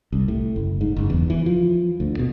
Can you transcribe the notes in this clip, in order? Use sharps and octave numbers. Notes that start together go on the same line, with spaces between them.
C2
A2
F#1
G#2
F#1
E2
E3
F3
D2
B2